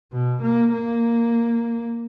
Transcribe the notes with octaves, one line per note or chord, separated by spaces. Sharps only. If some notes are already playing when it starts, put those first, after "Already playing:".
B2
A#3
A#3